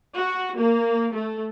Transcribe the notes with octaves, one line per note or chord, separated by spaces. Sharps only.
F#4
A#3
A3